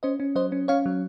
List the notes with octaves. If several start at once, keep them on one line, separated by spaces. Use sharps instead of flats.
C#4 C5 D#5
C#4
F#3 C5 D#5
C#4
C#4 C#5 F5
F#3